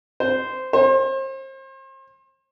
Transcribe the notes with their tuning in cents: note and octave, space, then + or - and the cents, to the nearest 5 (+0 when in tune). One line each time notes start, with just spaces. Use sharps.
C5 -15
C5 +35